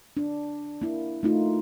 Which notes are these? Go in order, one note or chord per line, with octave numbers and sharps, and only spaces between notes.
D4
A#3 E4
A3 D#4 F4